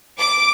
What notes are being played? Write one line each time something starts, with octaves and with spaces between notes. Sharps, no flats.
D6